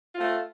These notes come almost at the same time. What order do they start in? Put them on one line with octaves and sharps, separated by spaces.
F4 C4 A3